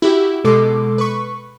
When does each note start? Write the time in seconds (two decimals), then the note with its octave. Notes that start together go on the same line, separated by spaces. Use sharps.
0.02 E4 F#4 G4
0.44 B2 G#3 A4 C6 D6
0.98 B4 C#6